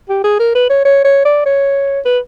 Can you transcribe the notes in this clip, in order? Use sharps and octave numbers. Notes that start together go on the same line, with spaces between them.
G4
G#4
A#4
B4
C#5
C#5
C#5
D5
C#5
B4